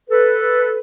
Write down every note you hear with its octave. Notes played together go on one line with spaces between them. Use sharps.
A4 B4